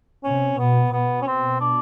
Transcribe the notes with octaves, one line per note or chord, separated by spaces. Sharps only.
C3 C#4
B2 B3
B2 B3
C#4
C4
D4